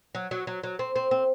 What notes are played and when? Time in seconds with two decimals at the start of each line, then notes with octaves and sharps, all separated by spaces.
0.15 F#3
0.31 F#3
0.47 F#3
0.63 F#3
0.79 C4
0.96 C4
1.11 C4